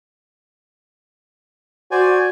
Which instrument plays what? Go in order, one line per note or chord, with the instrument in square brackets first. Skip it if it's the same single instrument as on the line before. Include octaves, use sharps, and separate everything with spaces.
[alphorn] F#4 [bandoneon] C5 D5 G#5